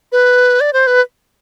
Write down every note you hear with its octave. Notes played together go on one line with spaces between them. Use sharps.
B4
D5
C5
B4